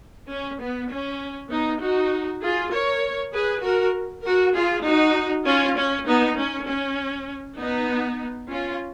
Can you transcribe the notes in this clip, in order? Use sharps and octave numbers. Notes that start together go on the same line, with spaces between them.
C#4
B3
C#4
B3 D#4
D#4 F#4
F4 G#4
A#4 C#5
G#4 B4
F#4 A#4
F#4 A#4
F4 G#4
D#4 F#4
C#4 F4
C#4
B3 D#4
C#4
C#4
B3 D#4
C#4 F4